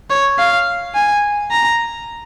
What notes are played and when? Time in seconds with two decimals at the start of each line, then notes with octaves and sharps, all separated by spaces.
0.10 C#5
0.38 F5
0.94 G#5
1.51 A#5